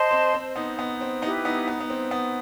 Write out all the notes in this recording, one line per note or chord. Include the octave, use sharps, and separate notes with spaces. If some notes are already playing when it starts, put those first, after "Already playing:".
Already playing: C5 D#5 A5 C6
C4
C4
B3 D#4
B3
C4
B3 D#4 E4 G4 B4
B3 D#4
B3
B3
C4
B3